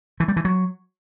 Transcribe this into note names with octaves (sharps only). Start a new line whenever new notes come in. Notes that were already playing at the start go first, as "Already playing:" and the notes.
E3
G3
E3
F#3